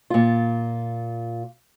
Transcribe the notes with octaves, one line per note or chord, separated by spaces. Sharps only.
A#2 F4